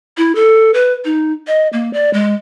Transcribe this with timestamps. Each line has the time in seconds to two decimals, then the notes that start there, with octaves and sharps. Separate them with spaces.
0.17 E4
0.35 A4
0.74 B4
1.05 D#4
1.47 D#5
1.73 A#3
1.93 D5
2.13 G#3